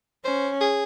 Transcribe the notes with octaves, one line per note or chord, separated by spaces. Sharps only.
C#4 C5
G#4